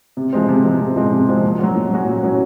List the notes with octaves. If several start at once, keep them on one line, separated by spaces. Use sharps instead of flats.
C3
F3 G#3 C4
C3
F3 G#3 C4
C3
F3 G#3 C4
C3
F3 G#3 C4
A#2
F#3 C#4 F#4
A#2
F#3 C#4 F#4
A#2
F#3 C#4 F#4